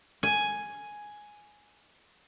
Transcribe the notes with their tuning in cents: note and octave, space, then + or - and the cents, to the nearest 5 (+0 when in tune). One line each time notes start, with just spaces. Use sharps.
G#5 +5